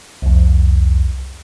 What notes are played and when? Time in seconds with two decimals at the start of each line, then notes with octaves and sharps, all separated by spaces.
0.22 C2 F2